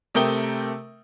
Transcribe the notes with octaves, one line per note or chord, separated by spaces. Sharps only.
C3 A3 A#4 G5 D#6 G7